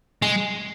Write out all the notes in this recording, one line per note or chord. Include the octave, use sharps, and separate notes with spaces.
G#3